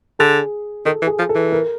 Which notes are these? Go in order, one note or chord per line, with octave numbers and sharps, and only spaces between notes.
D3 G#4
D#3 A4
E3
G#4
F3
A4
E3
A#4